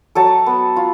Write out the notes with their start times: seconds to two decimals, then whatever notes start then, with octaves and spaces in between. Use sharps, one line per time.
0.15 F#3 A4 A5
0.46 B3
0.76 F4